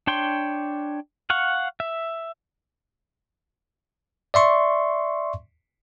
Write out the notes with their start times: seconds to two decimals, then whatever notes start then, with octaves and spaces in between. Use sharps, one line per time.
0.07 D4 C#5 G5 C6
1.30 F5 F#5 C#6
1.80 E5
4.34 D5 E5 C6 C#6